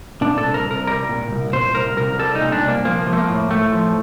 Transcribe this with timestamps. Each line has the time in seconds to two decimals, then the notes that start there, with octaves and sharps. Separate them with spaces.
0.21 A#2 D4
0.38 A4
0.43 C2
0.54 A#4
0.65 C2
0.71 A#4
0.87 G3 A#4
1.09 A#2
1.31 C2
1.53 A#2 C5
1.75 C2 A#4
1.97 C2 A#4
2.19 G3 A4
2.35 D#4
2.41 A#2
2.52 D4
2.63 C2
2.68 A#3
2.85 F3 A#3
3.07 F3
3.13 A3
3.18 A#3
3.29 A2
3.50 A2 A3
3.72 F3